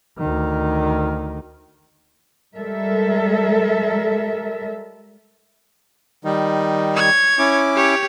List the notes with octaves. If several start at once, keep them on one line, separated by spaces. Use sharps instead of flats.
D2 D#3
G3 G#3 A4 A#4 E5
D#3 G3 D#4
C#5 G#6
C#4 E4 D6
G4 C#5